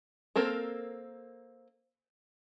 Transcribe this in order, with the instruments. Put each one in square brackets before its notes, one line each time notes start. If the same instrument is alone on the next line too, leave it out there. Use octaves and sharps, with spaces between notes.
[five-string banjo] A#3 C4 A4 A#4